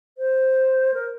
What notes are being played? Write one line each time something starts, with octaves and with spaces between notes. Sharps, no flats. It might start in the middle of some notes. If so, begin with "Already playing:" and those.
C5
A#4